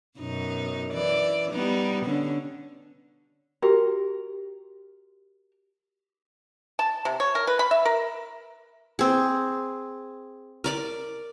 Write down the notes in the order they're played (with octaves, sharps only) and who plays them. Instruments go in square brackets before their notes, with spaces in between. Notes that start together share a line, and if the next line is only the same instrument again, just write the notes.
[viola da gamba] F#2 B2 D#4
E3 D5
G3 B3 D#4
D3 C#4
[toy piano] F#4 G4 G5 [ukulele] A#4
[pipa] A5
C3
C#5
A#4
B4
B5
E5
A#4
[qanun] C4 G#4
A#4 D5 D6